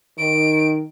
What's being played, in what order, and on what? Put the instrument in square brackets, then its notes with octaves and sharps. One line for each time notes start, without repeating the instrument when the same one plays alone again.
[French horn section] D#3 [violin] D7